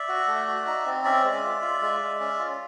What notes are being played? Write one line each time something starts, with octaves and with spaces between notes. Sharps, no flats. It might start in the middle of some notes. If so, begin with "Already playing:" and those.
Already playing: D5 E5
F#4
A3
F#4
D#4
C4
C#4 D5 E5
G#3
F4
F4
G#3
G#3
C#4
F4